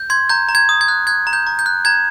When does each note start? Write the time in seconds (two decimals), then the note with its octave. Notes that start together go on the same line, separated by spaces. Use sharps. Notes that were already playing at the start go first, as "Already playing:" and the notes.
Already playing: G6
0.10 C6 G#6
0.29 A#5 G6
0.49 A#5
0.55 G#6
0.69 D#6
0.81 G#6
0.88 F#6
1.07 F#6 G#6
1.27 A#5
1.33 G6
1.47 A#5
1.59 G6
1.66 F#6
1.85 A#5 G#6